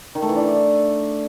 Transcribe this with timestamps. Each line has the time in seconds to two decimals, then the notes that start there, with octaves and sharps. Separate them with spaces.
0.15 D#3
0.22 A3
0.29 E3
0.36 D4